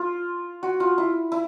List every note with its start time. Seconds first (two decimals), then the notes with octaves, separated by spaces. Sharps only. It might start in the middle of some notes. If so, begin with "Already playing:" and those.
Already playing: F4
0.63 F#4
0.80 F4
0.98 E4
1.32 E4